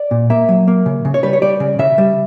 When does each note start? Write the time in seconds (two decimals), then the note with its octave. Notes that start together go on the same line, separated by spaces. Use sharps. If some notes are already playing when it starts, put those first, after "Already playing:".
Already playing: D5
0.11 A#2
0.30 A#3 E5
0.49 F#3
0.68 A#3
0.86 C#3
1.05 C#3
1.14 C#5
1.23 G3 B4
1.33 C#5
1.42 G3 D5
1.60 C#3
1.79 C#3 E5
1.98 G3